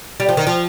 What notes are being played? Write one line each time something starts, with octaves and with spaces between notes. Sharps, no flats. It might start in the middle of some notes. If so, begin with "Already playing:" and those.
G3
F3
D#3
F3